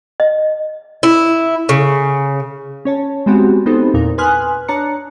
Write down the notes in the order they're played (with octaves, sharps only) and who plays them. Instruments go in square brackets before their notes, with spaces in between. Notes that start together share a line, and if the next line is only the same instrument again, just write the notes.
[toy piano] D#5
[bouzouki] E4
C#3
[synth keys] C#4 C#5 A5
G#3 B3 C4 F#4 G4
B3 C4 D#4 G4 A4 C5
E2 A#2 D#4 A#4
B4 G#5 C6 D#6 F6 F#6
D4 C#5 A5 A#5 F#6 C#7